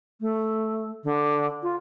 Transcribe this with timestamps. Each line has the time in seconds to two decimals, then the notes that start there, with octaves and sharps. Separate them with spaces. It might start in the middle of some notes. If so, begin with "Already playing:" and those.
0.21 A3
1.04 D3
1.62 F4